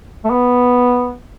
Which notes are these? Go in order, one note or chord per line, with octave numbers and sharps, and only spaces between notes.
A3
B3